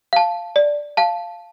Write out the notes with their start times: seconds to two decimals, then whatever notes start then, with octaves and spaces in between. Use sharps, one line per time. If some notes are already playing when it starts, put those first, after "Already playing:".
0.13 F5 A5
0.56 D5
0.97 F5 A5